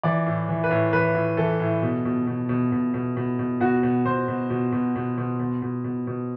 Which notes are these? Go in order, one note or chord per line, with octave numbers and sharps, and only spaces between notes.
E3 D5
A2
E3
B4
A2
E3 B4
A2
E3 A4
A2
B2
B2
B2
B2
B2
B2
B2
B2
B2 F#4
B2
B2 C5
B2
B2
B2
B2
B2
B2
B2
B2
B2